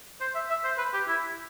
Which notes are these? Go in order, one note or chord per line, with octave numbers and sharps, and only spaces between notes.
C5
E5
E5
C5
B4
G4
E4